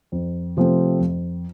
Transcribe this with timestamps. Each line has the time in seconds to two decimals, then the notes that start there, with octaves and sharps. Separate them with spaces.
0.12 F2
0.57 C3 F3 A3 C4
1.00 F2